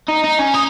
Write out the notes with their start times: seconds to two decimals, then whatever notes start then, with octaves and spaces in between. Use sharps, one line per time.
0.09 D#4
0.24 D#4
0.39 C#4
0.54 D#4